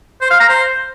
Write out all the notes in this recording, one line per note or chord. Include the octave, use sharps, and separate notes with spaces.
C5
F5
A#5
C5